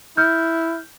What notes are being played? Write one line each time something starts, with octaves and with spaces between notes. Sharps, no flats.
E4 F6 G6